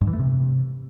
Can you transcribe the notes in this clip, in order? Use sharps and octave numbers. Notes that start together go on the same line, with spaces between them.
G2
E3
A3
C3